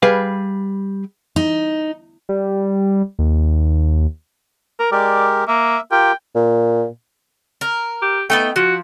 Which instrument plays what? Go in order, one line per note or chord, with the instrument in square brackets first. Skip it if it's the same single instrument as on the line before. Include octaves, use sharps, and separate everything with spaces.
[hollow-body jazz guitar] G3 G#4 B4 F5
[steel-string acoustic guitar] D#4
[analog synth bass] G3
D#2
[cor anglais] A#4
[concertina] G#3 G4 A#4 [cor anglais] D5
[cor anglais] A#3 [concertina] E5
[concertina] F4 G4 A#4 [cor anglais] G5
[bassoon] A#2
[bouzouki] A#4
[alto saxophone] G4
[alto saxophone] A3 [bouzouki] B3 D#4 G5
[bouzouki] F3 [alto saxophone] F#4